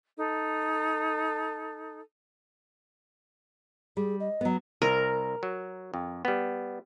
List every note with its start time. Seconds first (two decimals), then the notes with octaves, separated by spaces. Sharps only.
0.17 D#4 A4
3.97 G3 G#4
4.20 D#5
4.41 F#3 B3
4.82 C2 A#4
5.43 F#3
5.94 F2
6.25 G3 B3